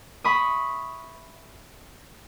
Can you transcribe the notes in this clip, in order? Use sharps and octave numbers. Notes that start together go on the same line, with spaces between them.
E5 B5 C#6 D#6